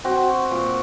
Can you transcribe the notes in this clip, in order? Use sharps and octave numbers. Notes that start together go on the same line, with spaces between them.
C4 F#4
A#2